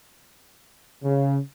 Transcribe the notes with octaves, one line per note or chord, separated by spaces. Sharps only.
C#3